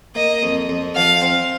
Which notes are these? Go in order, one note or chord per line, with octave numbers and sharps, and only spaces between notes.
A#3 D#5
F2
F2
F3 F5
C4